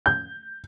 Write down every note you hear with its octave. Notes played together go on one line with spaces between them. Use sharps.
G6